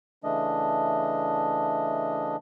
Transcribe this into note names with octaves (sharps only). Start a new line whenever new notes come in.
C#3 E3 A3 D4 D#5